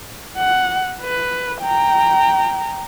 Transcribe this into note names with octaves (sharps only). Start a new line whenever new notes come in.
F#5
B4
G5 A#5